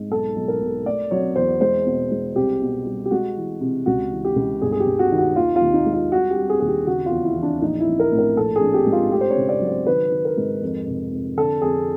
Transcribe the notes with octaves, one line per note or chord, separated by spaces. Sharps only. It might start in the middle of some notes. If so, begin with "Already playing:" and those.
Already playing: G#2
B1 A4
B1
A#4
B1
A3 D5
F#3 C#5
E2 C5
G#3 C5
B2
G#3
C2 G4
B2
G3
G4
G#3 F#4
E3
C3
C#2 F#4
E3
G4
C#2
G1 G#4
G#4
G4
G1
F#4
D#3
F#4
D#2 F4
F4
D#2
D#4
G#3
F4
G3 F#4
G4
G3
G#4
D#2 G#4
G4
C#3 F#4
F4
E2
E4
E3
D4
A#1 D#4
E4
A#1
A#4
A2
A#4
A#1 A4
G#4
A#1
G4
G#2
F4
A3 G4
C5
C#5
C#3
D5
F#3
C5
D#3 B4
D#3
A#4
G#2
F2
F1
F2
D3 A4
F2 G#4